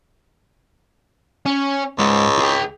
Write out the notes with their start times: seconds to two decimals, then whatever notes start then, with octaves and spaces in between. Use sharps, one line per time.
1.46 C#4
1.99 C#2 G#2
2.39 G#4 G5